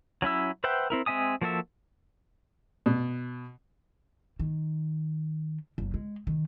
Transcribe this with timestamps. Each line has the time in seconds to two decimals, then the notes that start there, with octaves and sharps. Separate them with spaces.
0.22 F#3 C#4 E4 E6
0.64 B4 C5 E5 F#5 G5
0.90 C4 E4 A#4
1.06 G#3 C4 E5 G#5 D#6
1.41 F3 A#3 F#4 A4 E5
2.86 B2
4.39 D#3
5.78 F#1
5.94 G#3
6.27 D#3